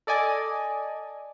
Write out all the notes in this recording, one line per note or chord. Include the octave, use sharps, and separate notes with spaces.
A4 D5 D#5 G#5